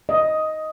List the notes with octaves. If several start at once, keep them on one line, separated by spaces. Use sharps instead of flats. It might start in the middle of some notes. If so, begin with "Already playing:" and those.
D#5